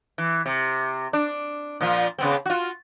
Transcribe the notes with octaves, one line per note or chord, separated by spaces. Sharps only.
E3
C3
D4
A#2 F3 F4
C#3 B3 C4
F4 F#4